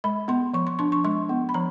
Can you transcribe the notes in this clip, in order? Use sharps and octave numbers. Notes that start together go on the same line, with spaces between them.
G#3 B5
B3 C6
F3 C#6
C6
D4 C6
C#6
G#3 C6
B3
B5
F3 A#5